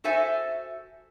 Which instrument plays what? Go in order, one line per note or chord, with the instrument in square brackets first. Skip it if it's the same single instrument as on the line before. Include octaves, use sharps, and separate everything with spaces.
[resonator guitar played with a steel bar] F#4 A4 C5 E5 G#5